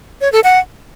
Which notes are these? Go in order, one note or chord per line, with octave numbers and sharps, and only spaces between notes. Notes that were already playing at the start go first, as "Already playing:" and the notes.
C#5
A4
F#5